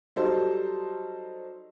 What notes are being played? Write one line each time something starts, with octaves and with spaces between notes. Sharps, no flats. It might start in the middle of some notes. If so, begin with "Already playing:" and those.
F#3 G3 D#4 A4 C5